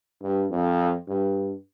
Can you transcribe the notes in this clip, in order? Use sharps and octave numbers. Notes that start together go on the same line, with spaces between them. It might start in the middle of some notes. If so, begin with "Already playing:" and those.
G2
F2
G2